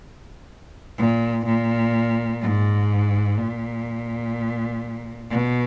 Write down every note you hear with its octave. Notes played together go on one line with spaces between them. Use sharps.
A#2
A#2
G#2
A#2
B2